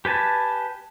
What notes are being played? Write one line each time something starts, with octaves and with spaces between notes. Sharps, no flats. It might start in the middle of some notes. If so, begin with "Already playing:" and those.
G4 B4 G#5 A5